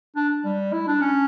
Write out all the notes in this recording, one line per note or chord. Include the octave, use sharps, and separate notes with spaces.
D4
G3
E4
D4
C#4